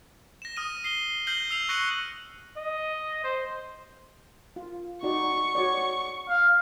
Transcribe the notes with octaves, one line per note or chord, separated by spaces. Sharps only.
A#6 E7
D#6 F6 A#6 D#7
C7 G7
F6 G6 A#6 C7 F#7 G7
E6 C7 F7
C#6 F#6 A#6 C#7 D#7 F#7
D#5
C5
F4
D#4 F#4 D5 C#6
F#4 C#5 D5
F5